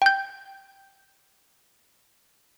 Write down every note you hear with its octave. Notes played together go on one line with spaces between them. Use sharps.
G5 G6